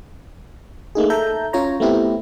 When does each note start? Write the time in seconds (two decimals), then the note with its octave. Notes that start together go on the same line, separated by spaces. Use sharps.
0.95 A3 A#3 D#4 G#4
1.10 A4 E5 A5 A#5 G6
1.53 C#4 F4 C#5 A#5
1.80 A3 B3 C4 E4 G4